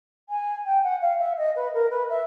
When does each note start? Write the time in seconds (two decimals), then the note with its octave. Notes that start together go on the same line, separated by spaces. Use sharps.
0.29 G#5
0.66 G5
0.83 F#5
1.01 F5
1.19 E5
1.38 D#5
1.56 B4
1.74 A#4
1.91 B4
2.10 E5